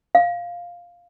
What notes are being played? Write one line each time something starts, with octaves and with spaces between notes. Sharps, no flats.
F5